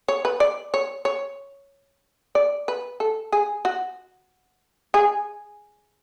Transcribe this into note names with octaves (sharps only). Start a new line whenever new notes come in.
C#5
B4
D5
C#5
C#5
D5
B4
A4
G#4
F#4
G#4